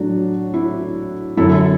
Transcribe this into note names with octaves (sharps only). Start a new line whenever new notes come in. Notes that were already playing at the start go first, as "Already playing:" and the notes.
Already playing: A2 F#3 D4 F#4
E4
F#2 D3 F#3 E4 A4